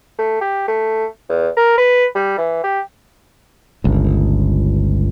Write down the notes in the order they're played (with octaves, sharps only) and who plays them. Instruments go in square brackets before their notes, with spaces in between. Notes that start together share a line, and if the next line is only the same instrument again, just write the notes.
[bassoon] A3
G4
A3
E2
A#4
B4
G3
E3
G4
[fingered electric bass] G1 C#2